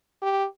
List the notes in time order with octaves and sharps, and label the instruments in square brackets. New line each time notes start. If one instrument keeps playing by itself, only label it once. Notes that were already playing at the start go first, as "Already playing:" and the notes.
[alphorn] G4